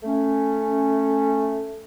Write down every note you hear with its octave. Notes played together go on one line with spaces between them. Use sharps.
A3 C#4